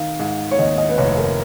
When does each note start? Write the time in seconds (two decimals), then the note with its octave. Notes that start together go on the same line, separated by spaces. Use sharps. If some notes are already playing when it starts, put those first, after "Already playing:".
Already playing: D#3 F5
0.19 G#2
0.51 C#5
0.59 D#2 D#5
0.78 D#5
0.89 B4
0.98 F1 C#5
1.17 A#4